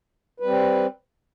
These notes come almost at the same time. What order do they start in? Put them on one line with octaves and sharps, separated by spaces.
B4 G3 C4